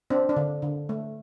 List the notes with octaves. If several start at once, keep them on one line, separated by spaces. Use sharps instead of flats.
C4 D4
D4
D3
D3
A3